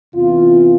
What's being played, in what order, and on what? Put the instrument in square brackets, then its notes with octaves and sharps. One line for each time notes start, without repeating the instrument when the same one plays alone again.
[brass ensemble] E2 C3 E3 F4